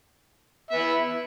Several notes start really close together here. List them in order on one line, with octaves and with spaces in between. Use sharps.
E5 B3 E4